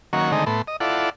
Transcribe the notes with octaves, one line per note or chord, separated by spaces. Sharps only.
D#3 F#3 A#3 C#4 F#4
D3 D#3 G#3 A3 C4 D#4
A2 A3 B3 C6
D#5
E4 F4 A4 D5 F#5